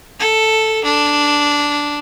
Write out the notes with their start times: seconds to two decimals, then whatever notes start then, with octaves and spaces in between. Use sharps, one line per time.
0.19 A4
0.84 D4